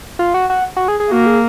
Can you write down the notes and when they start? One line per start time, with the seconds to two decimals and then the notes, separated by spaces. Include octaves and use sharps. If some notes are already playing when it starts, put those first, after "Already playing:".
0.19 F4
0.34 F#4
0.50 F#4
0.76 F#4
0.88 G#4
1.00 G#4
1.11 A#3 F#4
1.26 G#4